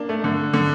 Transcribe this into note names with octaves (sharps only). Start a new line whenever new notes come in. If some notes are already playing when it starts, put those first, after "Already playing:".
Already playing: A#3 D4
A3
D3
D3